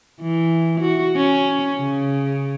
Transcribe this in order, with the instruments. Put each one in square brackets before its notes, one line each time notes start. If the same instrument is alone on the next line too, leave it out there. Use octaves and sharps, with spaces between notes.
[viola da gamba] E3
F#4
C#4
C#3